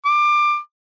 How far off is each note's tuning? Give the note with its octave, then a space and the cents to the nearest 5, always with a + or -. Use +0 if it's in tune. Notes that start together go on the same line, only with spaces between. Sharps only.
D6 +20